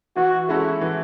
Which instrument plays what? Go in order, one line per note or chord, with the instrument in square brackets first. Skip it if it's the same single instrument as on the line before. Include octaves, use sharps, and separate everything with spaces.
[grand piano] E3 [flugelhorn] F#4
[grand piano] G#3 C#4 F#4 A4 [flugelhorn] E4
[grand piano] E3